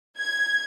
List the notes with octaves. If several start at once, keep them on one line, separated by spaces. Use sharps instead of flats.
G#6